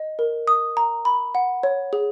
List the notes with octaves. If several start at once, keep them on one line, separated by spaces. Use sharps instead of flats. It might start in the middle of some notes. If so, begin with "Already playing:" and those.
Already playing: D#5
A#4
D#6
A#5
B5
F#5
C#5
G#4